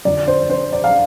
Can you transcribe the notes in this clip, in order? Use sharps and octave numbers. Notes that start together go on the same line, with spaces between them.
F2 D3 F3 D5
C5
C5
D5
F5